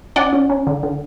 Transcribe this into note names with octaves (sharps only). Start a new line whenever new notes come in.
C#4 D5 F#5
C#4
C#4
D3
D3